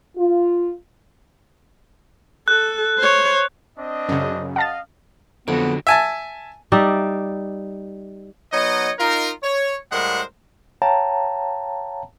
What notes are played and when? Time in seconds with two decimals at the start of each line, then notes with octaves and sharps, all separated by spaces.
0.16 F4
2.48 A4 F#6
2.98 C5 C#5
3.78 C4 D4 D#5
4.09 F#2 C#3
4.56 D#5 F5 F#5 A5 A6
5.48 F2 D3 F#3 B3
5.87 E5 G#5 A5
6.72 G3 D#4 D5 E5
8.53 F#3 B3 D#4 C#5 D#5
8.99 D#4 F4 A#4
9.43 C#5
9.92 A2 G3 G#3 A#4 C5 F#5
10.82 C#5 F5 G5 A5 A#5